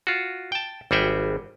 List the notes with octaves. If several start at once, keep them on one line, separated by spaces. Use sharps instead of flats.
F4 F#4
G5 A5
G#1 G3 F#4 G#4 E5 G5